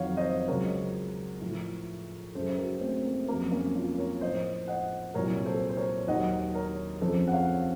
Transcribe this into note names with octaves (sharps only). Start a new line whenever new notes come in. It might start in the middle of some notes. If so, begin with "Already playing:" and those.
Already playing: F2 D#3 F#3 C#5 F5 F#5
C5 D#5
C#2 C#3 F#3 A#4 C#5
A2 F3
F#2 C#3 F#3 A4 C5
F#4 A#4
A3 C4
A#3
F2 C#3 F#3 A#3
A#3 C#4
C#4 F4
A#4 C#5
A2 F3 C5 D#5
D#5 F#5
C2 A#2 F#3 A#4 C#5
A4 C5
C5
A#4 C#5
D#2 D#3 F#3 D#5 F#5
A#4 C#5
F2 C#3 F3 A4 C5
F#5
C#5 F5